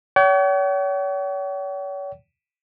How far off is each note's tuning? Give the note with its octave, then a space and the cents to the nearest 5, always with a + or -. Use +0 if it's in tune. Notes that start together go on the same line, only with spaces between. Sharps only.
C#5 +40 G5 -45